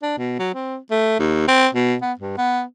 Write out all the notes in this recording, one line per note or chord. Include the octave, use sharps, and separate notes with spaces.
D4
B2
F#3
C4
A3
D#2
C4
B2
B3
G2
B3